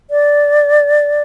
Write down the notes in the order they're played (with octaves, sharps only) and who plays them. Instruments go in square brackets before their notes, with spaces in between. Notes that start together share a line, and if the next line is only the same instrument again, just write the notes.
[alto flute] D5